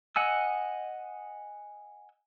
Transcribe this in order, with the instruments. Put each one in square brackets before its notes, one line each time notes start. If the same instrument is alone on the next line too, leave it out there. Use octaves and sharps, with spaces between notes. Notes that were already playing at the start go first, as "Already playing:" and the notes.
[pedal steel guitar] D#5 F#5 G#5 E6